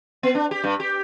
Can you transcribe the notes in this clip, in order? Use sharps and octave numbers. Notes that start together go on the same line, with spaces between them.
B3
D4
G4
G2
G4